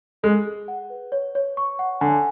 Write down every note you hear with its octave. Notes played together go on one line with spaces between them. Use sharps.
G#3 G#4
G#4
F#5
B4
C#5
C#5
C#6
F#5
D3 G#5